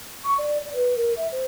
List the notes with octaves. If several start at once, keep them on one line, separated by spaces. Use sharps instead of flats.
C#6
D5
D5
B4
A#4
E5
C5